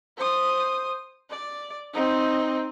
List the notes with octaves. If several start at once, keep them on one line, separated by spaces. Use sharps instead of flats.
C5 D#6
D5
C4 D#4